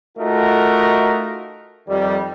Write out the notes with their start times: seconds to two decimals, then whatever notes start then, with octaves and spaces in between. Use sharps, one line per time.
0.18 A3 D#4 F4 F#4 A#4
1.88 F2 D#3 G3